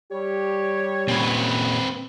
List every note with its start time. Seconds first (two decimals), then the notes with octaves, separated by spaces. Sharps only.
0.12 G3 G4 C#5
1.08 A#2 C4 C#4 B4